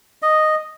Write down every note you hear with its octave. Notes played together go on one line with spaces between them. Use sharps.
D#5